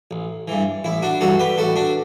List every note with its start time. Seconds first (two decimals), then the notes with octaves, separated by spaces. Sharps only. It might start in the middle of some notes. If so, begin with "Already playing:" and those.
0.11 A1
0.48 G2 E3
0.84 A1 E4
1.02 D4 F#4
1.20 G2 E3 F#4 A4
1.39 G4 B4
1.58 A1 F#4 A4
1.76 D4 F#4